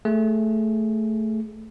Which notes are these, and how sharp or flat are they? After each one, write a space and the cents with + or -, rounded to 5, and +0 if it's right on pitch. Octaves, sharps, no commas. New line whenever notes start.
A3 +0 G#4 +0